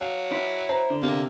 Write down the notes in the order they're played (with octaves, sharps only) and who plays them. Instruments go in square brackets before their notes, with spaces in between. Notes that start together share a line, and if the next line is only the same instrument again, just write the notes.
[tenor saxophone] F#3 [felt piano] F5
[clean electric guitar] E4
[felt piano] C5 A#5
[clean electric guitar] D3
[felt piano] C3 [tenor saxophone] A#3